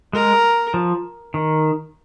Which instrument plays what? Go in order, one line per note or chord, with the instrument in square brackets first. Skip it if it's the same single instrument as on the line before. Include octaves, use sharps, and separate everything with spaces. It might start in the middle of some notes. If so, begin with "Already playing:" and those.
[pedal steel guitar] G#3 [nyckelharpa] A#4
[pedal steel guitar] F3
D#3